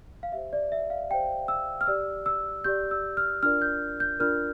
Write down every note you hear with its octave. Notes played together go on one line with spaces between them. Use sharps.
F5
G4 C5 E5
D5
E5
F5
G4 C5 G5
E6
F6
G4 D5 E6
E6
G4 D5 G6
E6
F6
D4 F4 A#4 D5 F6
G6
G6
D4 F4 A#4 D5 F6